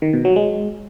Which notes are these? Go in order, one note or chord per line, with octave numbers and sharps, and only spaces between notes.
D#3
B2
F#3
G#3